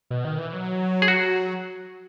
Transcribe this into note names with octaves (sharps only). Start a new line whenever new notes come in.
B2
D#3
E3
F#3
G#4
F#4